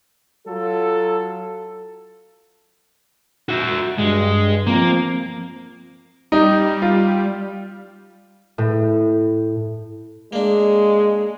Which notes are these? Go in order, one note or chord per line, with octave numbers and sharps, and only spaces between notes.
F#3 F4 A4
F#4 E5
G2 G#3
F3 A#3 C4
G3 D#4
F4
A2
G#3 A#3 D4